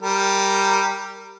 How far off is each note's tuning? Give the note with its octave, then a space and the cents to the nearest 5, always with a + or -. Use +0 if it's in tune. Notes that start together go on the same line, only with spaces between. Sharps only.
G3 +0 A#4 -10